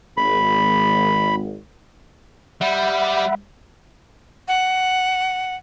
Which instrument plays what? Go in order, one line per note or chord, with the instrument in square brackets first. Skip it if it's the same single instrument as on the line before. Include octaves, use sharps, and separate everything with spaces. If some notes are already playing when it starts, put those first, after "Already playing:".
[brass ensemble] G#1 [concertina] B5
[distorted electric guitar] G3 [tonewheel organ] E5 F#5 B5
[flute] F#5